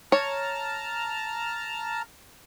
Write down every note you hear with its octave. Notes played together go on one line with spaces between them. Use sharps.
C#5 A5 A#5 F6